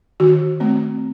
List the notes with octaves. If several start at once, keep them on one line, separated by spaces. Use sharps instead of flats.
D#3 F#4
A3 C4